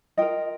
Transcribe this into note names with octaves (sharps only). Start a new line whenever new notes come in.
F4 A#4 D#5 G5